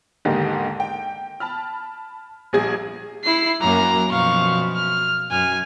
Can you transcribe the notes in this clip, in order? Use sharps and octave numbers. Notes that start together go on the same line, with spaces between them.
D#2 G#2 D3 A#3 D#4 G4
G5
A5 B5 F6
A#1 G3 G#4 G#6
E4 C7
F#2 F#3 A#3 A#5
F#2 B2 F3 F5 C#6
F6
F#2 G#5 F6